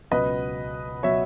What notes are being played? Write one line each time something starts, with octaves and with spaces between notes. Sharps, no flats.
C#2 B2 F#3 B4 D#5
B2 F#3 C#5 E5